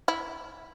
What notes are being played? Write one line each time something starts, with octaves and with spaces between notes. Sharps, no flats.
E4